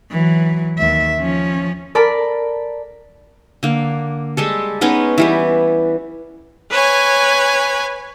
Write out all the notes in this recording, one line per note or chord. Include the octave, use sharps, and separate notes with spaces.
E3 F#3
D#2 E5
F3 C#4
A4 A#4 D5 A5 B5
D3 A#3
G3 G#3 A4
G#3 B3 C#4 D#4
E3 G3 B3
B4 C#5 G#5